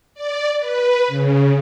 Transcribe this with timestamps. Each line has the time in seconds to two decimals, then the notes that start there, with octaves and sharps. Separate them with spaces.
0.14 D5
0.58 B4
1.08 C#3